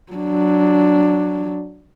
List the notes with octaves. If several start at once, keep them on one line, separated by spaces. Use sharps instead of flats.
F#3 D4